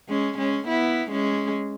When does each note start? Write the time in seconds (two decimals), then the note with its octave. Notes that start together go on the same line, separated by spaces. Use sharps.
0.09 G#3 C#4
0.38 G#3 C#4
0.67 B3 E4
1.11 G#3 C#4